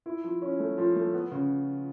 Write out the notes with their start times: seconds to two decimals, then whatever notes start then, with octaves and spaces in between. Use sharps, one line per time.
0.06 E4
0.24 F3
0.42 C#4
0.60 A3
0.78 F3
0.96 A3
1.14 B3
1.31 C#3